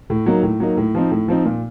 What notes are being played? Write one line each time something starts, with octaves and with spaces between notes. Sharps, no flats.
A2
F#3 A#3 D#4
A2
F#3 A#3 D#4
A2
F3 C4 D#4
A2
F3 C4 D#4
A#2